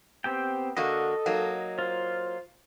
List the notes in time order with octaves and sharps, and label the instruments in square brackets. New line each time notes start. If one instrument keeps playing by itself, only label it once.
[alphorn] B3 [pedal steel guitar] C4 G4 G5
[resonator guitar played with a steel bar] D3 A#3 F#4 [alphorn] A4 [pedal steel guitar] D#5
[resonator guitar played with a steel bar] F#3 A#3 D#4
[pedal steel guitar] F4 [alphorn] C5